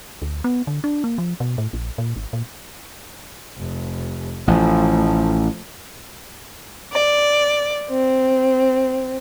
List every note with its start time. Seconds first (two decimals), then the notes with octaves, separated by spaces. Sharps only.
0.22 D2
0.44 B3
0.67 D3
0.84 D4
1.04 A#3
1.18 F3
1.40 B2
1.58 A2
1.73 A#1
1.98 A#2
2.16 G#1
2.33 A#2
3.59 F1
4.48 A1 F3 A3
6.93 D5
7.89 C4